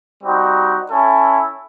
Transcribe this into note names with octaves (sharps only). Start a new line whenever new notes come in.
G3 C4 D#4 F#4
C#4 E4 A4